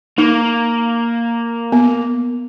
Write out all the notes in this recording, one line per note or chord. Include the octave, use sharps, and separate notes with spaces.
A#3 D#4
B3